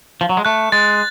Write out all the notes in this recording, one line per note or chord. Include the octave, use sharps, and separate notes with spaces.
F3
F#3
G#3
A3 F#6
G#3 A6